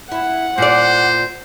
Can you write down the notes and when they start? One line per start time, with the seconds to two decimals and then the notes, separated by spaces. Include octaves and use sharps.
0.12 E4 F#5
0.58 A#2 C5 D5